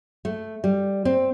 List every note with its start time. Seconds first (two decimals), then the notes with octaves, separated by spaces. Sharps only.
0.25 A3
0.64 G3
1.05 C4